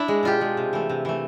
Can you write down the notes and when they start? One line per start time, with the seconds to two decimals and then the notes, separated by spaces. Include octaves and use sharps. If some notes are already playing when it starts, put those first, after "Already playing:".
Already playing: D4 E4
0.08 G#3
0.23 B2 F4 G4
0.41 G#3
0.57 C3
0.73 E3 A3
0.89 C3
1.05 E3 A3